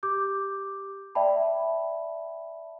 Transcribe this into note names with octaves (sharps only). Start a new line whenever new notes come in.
G4 D6 G6
D5 E5 G5 A5 B5